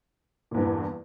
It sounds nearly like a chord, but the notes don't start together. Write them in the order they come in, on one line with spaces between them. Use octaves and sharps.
A#2 E2 G2 E3